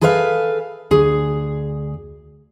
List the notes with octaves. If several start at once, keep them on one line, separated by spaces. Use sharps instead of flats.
G#4 A4 B4 C5 E5 F5
D2 G#4